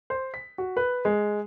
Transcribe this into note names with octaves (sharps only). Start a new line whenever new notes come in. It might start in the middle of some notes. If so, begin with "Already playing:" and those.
C5
B6
F#4
B4
G#3